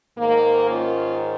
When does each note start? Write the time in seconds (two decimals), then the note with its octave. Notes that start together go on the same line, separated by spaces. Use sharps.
0.18 G#2 D#3 A#3
0.70 C#4 F4